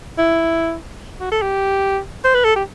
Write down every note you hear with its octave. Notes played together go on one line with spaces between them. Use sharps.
E4
F#4
A4
G4
C5
B4
A4
G4